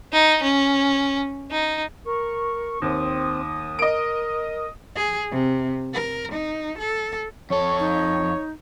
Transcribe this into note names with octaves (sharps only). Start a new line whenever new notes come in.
D#4
C#4
D#4
A#4 C#6
D#2 C4 D#6
A#4 D#5 D7
G#4
C3
A#4
D#4
A4
F2 A4 C#5
D#4